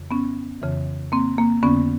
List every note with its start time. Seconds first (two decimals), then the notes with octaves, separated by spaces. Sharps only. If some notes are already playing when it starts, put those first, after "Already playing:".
Already playing: F2 C#3 E3
0.11 B3 C#4
0.62 F2 C#3 E3
1.12 A#3 C4
1.38 A#3
1.63 F2 D3 B3 C#4